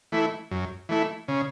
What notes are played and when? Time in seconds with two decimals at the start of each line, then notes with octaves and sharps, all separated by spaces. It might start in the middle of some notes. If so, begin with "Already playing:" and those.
0.12 E3 A3 E4
0.51 F#2
0.89 E3 A3 E4
1.28 C#3